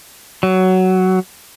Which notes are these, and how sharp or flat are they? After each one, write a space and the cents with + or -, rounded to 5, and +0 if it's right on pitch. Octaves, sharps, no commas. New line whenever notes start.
F#3 +10